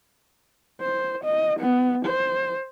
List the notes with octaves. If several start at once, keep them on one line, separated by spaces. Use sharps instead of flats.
C5
D#5
B3
C5